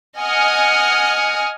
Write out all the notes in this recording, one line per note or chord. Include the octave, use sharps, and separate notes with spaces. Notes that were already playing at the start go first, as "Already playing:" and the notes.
D#5 F#5 G#5 D#6 F6 C#7